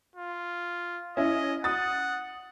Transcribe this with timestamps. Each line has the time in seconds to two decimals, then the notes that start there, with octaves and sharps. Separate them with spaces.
0.16 F4
1.17 C#4 E4 D#5
1.64 F#5 D#6 A6